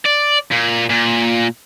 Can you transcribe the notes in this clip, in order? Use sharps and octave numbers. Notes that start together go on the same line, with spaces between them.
D5
A#2
A#2